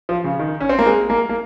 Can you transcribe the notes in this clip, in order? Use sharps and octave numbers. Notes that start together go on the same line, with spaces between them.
F3
C#3
D#3
C#4
C4
A#3
G#3
A#3
A#3